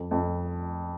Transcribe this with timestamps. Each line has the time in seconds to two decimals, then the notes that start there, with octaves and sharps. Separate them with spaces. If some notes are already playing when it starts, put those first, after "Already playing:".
Already playing: F2
0.11 F2